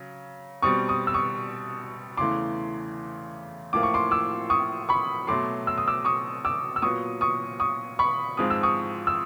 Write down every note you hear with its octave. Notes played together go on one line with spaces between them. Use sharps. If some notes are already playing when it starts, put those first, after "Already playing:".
Already playing: C#3 F#3
B2 G3 C4 C#6 D#6
C#6 D#6
E6
C#6 D#6
E2 C#3 E3 A3 C6 D6
A2 F3 A#3 D6
C#6
C6 D6
D6 E6
C#6 D#6
B5 C#6
B2 F#3 A3 C6 D6
E6
D#6
D6 E6
C#6 D#6
D6 E6
E6
A#2 F#3 B3 C#6 D#6
C#6 D#6
C#6 D#6
B5 C#6
G#2 F3 G#3 C4 D#6
E6
C#6 D#6
E6